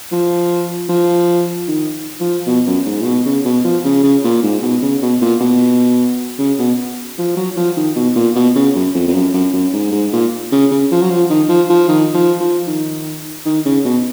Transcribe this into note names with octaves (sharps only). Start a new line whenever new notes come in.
F3
F3
D#3
F3
B2
F#2
G#2
A#2
B2
C#3
B2
F3
C#3
C#3
A#2
G#2
B2
C#3
B2
A#2
B2
C#3
B2
F3
F#3
F3
D#3
B2
A#2
B2
C#3
F#2
F2
F2
F#2
F#2
F#2
G#2
G#2
A#2
C#3
C#3
F3
F#3
F3
D#3
F3
F3
D#3
F3
F3
D#3
D#3
C#3
B2